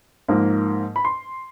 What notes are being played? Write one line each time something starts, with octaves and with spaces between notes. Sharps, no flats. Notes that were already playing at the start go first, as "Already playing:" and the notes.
G#2 F3 A#3
B5
C6